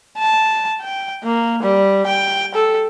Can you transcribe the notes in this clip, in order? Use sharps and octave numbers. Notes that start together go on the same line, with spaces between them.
A5
G5
A#3
G3
G5
A4